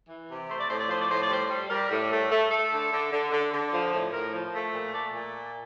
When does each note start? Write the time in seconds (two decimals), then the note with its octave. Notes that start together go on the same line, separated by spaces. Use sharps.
0.09 E3
0.29 C3
0.49 A3 C5
0.59 D5
0.69 A2 C5
0.80 D5
0.89 F3 C5
1.00 D5
1.09 A2 C5
1.21 D5
1.29 G3 C5
1.49 G3
1.70 G3 A#4
1.90 A2
2.11 A3
2.31 A3
2.50 A3 A4
2.71 D3
2.92 D3
3.11 D3
3.32 D3
3.52 D3
3.72 F3
3.93 A2
4.12 A2 A#4
4.33 F3
4.53 A3
4.73 A#2
4.93 A3 D5
5.13 A#2